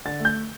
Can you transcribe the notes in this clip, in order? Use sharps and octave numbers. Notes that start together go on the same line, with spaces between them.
D3 A6
A3
G6